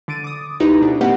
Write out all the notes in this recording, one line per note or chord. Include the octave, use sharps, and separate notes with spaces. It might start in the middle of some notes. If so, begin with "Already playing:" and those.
D3 A6 D7 D#7
D6 D#6
D2 D#4 E4 G4 B4 A#5
B2 D4
A#3 C4 G4 B4 D#5 F#5